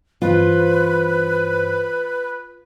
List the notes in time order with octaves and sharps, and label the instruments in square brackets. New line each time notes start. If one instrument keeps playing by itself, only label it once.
[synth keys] G2 E3 C5 [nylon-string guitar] F4 [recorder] B4